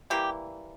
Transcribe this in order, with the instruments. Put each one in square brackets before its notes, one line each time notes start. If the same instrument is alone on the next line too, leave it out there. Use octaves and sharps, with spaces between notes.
[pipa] E3 G3 A#3 G4